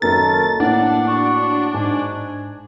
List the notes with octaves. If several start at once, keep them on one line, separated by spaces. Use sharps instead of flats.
F#1 F#2 D#3 A4 A#4 A6
A2 A#3 D4 F#5
F#4 C#6
G#2 G#5